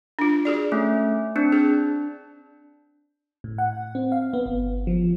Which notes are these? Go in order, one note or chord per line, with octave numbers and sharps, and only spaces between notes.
D4 F4
F#4 G#4 D5
A3 C#4
C4 D4
D4 G#4
A2
F#5
C4
F5
B3
G1
F3